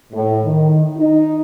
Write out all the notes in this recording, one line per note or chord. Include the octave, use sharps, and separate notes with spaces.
A2
D#3
D#4